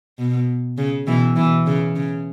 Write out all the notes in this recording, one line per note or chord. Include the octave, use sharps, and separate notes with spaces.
B2
C#3
B2 E3
B2 E3
C#3
C#3